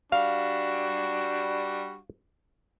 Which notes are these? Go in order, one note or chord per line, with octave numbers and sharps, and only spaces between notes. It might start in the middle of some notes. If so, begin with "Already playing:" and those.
G3 D4 F#4 F5